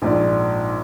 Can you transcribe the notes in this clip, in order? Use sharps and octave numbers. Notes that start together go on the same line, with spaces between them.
A#1 G#2 D5